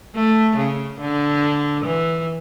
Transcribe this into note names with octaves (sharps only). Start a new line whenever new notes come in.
A3
C#3
D3
E3